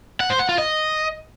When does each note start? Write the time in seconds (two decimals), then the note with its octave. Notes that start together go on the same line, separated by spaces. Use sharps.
0.20 F#5
0.30 C5
0.39 F#5
0.49 F4
0.58 D#5